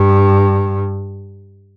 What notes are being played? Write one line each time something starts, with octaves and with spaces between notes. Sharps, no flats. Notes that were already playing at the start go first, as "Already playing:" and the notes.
Already playing: G2